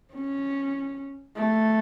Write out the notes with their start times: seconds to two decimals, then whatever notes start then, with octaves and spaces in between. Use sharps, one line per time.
0.14 C#4
1.36 A3